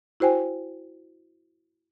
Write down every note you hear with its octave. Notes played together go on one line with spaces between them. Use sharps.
E4 F#4 C5 G5 G#5